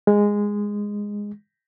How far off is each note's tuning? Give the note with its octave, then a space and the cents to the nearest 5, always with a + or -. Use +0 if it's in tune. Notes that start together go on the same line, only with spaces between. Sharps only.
G#3 -10